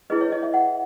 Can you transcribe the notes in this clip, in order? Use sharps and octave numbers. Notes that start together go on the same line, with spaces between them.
E4 G#4 B4 D#5
C#5
D#5
E5
F#5